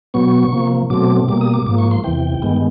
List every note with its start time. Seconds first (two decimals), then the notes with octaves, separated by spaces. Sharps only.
0.14 B2 F#3 B3 C#6
0.52 C3 F3 A#3
0.90 B2 F#3 A3 C4 D6
1.28 B2 G3 A#3 D6
1.41 D#6
1.54 D6
1.66 G#2 F3 A#3 D6
1.78 C#6
1.91 C6
2.04 E2 C3 E3 G5
2.42 G2 D#3 G#3 B3